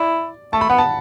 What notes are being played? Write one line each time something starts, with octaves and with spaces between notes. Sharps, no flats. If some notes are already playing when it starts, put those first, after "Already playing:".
Already playing: E4 D5
A3 A5
B5
B3 F#5
A5